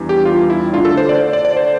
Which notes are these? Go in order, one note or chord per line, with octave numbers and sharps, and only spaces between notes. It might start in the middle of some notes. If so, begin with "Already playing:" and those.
Already playing: E2 E3 G3 D4
G4
F4
E4
D3 A3 D4 F4
A4
C5
D5
D5
D5
C5